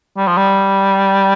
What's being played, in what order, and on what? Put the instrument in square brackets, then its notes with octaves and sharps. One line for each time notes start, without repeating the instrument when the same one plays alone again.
[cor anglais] G3
F3
G3